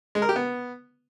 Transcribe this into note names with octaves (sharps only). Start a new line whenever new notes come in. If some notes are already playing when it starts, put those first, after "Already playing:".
G#3
A#4
G4
B3